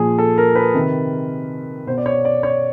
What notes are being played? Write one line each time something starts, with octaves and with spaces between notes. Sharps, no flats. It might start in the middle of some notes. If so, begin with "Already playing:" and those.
Already playing: A#2 F3 G#4
A4
A#4
B4
C3 D#3
B2 C5
D5
C#5
D5
C#5